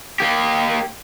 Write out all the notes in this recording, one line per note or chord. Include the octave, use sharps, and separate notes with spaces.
A#3 G4